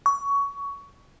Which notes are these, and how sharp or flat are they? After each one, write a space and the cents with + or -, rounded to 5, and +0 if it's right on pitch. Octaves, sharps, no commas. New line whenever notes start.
C#6 +15